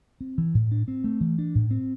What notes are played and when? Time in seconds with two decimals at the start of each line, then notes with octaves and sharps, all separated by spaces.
0.21 C4
0.38 E3
0.55 A2
0.72 D4
0.88 C4
1.04 A3
1.21 E3
1.38 D4
1.55 A2
1.71 C4